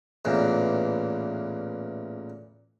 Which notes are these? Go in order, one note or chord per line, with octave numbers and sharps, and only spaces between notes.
A1 E2 A#2